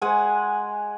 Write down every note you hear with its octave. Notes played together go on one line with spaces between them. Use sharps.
G#3 F#5 G#5